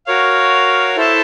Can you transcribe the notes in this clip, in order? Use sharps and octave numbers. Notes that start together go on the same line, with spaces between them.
F#4 A#4 C#5 F5
E4 A4 C5 E5 A5